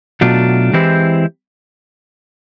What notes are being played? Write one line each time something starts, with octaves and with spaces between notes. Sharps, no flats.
B2 F#3 A3 D4 F4
E3 G#3 C4 E4 G4